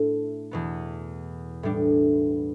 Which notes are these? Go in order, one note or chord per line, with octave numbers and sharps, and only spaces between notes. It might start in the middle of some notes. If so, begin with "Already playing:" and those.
Already playing: A2 A3 D4 A4
E2 B2 B3
A2 G3 D4